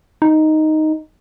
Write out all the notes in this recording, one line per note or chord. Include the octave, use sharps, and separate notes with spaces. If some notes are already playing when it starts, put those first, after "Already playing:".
D#4